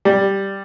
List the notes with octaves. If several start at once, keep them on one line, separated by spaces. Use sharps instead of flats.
G3